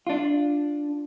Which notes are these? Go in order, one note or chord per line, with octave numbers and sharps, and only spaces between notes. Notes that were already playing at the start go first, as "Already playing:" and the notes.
D4 F4